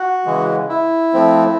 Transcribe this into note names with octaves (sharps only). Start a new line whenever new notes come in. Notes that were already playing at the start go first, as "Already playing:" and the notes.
Already playing: F#4
C#3 E3 G#3
E4
F3 A3 C4